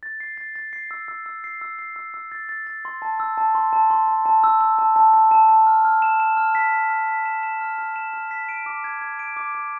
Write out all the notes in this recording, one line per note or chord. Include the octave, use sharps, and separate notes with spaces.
A6
C7
A6
A6
C7
E6
E6
E6
C7
E6
C7
E6
E6
A6
A6
A6
C6
A5
E6
A5
C6
A5
C6
A5
A5
E6
E6
A5
A5
A5
A5
A5
F6
F6
E7
E7
F6
B6
B6
F6
B6
E7
E7
F6
F6
E7
F6
B6
D7
D6
G#6
G#6
D7
D6
D6